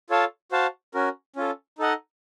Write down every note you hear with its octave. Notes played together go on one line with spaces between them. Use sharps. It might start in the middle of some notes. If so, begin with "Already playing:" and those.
F4 A4 C#5 F5 A5
F#4 C5 F5 A5
C#4 F#4 A#4
C#4 F4 A4
D#4 A4 D#5 F#5